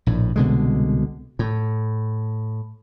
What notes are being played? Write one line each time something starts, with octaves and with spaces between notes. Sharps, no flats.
A#1 A2
C2 B2 D3 G#3
A2